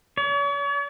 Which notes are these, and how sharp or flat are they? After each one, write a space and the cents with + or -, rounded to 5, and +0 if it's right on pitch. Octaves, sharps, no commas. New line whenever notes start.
C#5 +45